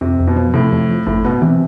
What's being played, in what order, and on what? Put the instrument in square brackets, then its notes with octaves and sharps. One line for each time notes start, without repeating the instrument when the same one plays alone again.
[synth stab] F2 [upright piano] C3
[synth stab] F2
[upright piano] B2
[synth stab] F3
[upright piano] A2 [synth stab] C3
[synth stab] F2
F2
[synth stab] G1 [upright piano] A2
[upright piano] B2 [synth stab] B3
[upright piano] C3 [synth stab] E3